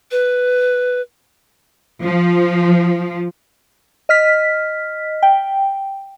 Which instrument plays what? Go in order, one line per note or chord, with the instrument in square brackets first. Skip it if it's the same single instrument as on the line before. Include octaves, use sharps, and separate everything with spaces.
[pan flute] B4
[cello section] F3
[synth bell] D#5 F6 B6
G5